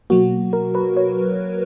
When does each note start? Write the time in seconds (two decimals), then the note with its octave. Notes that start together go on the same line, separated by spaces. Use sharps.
0.10 B2 F#3 A#3 F#4
0.53 A#4
0.75 B4
0.97 C#5